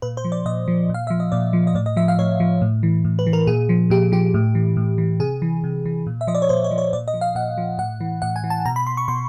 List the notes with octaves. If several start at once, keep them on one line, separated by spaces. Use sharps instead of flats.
A#2 B4
C5
F3
D5
A#2 D#5
F3
A#2
F5
F3 E5
D#5
A#2 D5
F3
D#5
A2 D5
D#5
F3 E5
F5
A2 C#5
F3
A2
E3
A2
B4
E3
A#4
A#2 G#4
F3
A#2 G4
F3 G4
A2
E3
A2
E3
C3 G#4
E3
C3
E3
A#2
E5
F3 D#5
D5
C#5
A#2 C5
C#5
F3
C#5
A#2 D5
D#5
F3
F5
A#2 F#5
F3
A2 F#5
E3
A2 F#5
G#5
E3
A5
B2 A#5
B5
C6
C#6
B2 C6